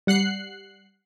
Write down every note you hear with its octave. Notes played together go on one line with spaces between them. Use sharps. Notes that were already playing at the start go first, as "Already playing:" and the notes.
G3 F#5 F#6 C7